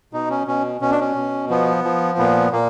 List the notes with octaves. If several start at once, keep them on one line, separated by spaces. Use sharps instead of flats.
B2 D#4
C#4
B2 C#4
B2 C#4
D4
C#4
B2
F3 B3
F3
A#2 B3
A#2 A#3